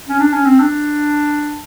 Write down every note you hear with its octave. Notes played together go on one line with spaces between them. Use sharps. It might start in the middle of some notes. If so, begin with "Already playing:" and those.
C#4
D4
C#4
C4
D4